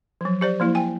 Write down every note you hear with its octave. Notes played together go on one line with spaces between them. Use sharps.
F3 F#3
G4 C5 D5
F3 A#3 E4
G5 G#5